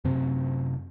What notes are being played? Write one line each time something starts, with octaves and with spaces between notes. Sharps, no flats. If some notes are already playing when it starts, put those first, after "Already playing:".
F#2 C3 C4